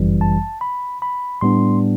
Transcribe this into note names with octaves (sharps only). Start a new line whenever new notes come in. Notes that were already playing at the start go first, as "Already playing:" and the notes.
Already playing: G1 F#2 E3 G3
A5
B5
B5
A2 G3 B3 D4 C6